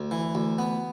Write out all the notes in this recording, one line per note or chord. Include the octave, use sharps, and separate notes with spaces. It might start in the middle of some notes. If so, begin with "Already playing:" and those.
Already playing: D2
E3
D2
B3